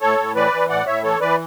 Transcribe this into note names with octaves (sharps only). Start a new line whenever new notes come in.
A2 A4 C#5
A2
E3 B4 D5
E3
A2 D5 F#5
A2 C#5 E5
E3 A4 C#5
E3 B4 D5